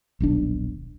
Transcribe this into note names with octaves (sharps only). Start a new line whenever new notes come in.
D#1 B1 D4